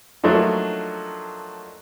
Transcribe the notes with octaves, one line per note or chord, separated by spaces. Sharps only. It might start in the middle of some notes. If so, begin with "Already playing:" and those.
F3 F#3 A3 A#3 D4 D#4